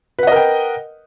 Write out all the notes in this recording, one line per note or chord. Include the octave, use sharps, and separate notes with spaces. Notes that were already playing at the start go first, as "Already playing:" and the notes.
A#4 B4 D#5 F#5 G5